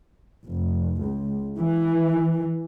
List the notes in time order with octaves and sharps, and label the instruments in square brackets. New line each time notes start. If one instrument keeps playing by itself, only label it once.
[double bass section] F1
C#2
E3